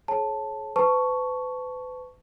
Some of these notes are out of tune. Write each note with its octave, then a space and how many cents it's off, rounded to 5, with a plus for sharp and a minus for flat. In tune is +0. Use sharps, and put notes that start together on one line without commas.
G#4 +40 C#5 -25 A5 +0
B4 +40 A5 +0 C#6 +5